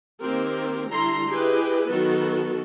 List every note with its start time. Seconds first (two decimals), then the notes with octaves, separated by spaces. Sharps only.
0.20 D#3 A#3 C4 G4 A#4
0.91 D3 G3 E4 A4 A#5 C6
1.29 E4 G4 G#4 B4 D#5
1.91 D#3 F#3 B3 F#4 A4